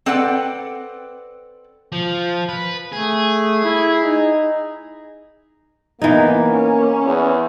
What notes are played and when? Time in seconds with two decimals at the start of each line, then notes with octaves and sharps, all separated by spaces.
0.06 C4 A4 B4 D5 F#5 G5
1.92 F3
2.49 B4
2.93 A3 G#4
3.64 E4
4.03 D#4
6.02 E3 A#3 B3 D#4
6.51 C#4
7.05 E2